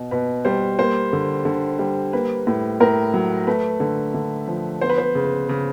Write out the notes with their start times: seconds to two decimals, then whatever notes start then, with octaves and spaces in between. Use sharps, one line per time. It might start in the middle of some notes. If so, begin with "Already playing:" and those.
Already playing: B2
0.11 B2 B4
0.45 G3 C5
0.79 A#3 C5
1.13 D3
1.45 D3
1.79 G3
2.13 A#3 B4
2.47 A2
2.80 A2 A#4
3.14 F#3
3.47 A3 B4
3.80 D3
4.14 D3
4.48 F3
4.81 B3 C5
4.90 B4
4.98 C5
5.15 C#3
5.49 C#3